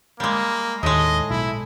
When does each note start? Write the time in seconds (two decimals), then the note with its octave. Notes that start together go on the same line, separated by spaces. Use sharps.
0.20 G3 G#3 A#3
0.83 D#2 A2 G#3 D#5
1.30 B1 E4